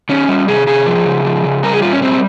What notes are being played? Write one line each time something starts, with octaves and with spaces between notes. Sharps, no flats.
D#3 C#4
G3
C3 G#4
C3 G#4
F3
C#3
F3
C#3
G3 A#4
G#4
A#2 F4
C#4
G3 C4